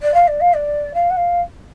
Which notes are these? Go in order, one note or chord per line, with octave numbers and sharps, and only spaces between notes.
D5
F5
D5
F5
D5
F5
F#5
F5